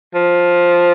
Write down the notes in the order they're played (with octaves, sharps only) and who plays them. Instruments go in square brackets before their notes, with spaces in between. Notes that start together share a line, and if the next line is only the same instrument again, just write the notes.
[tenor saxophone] F3